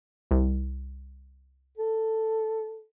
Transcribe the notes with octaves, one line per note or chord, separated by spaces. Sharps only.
C2
A4